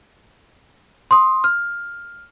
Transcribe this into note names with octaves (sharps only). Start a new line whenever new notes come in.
C6 D#6
F6